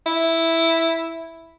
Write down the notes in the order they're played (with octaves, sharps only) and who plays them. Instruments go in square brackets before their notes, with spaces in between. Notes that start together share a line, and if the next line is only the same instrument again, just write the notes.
[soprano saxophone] E4